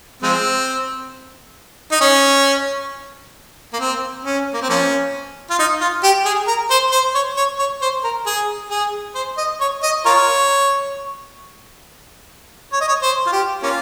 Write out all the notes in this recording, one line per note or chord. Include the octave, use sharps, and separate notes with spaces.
F3 G#3 C4
D#4
C#4
A#3
C4
C#4
A#3
C4
F3 A#3 C#4
F4
D#4
F4
G4
G#4
A#4
C5
C5
C#5
C#5
C#5
C5
A#4
G#4
G#4
C5
D#5
C#5
D#5
F4 A#4 C#5
C#5
D#5
C#5
C5
F4
G4
A#3 C#4 F4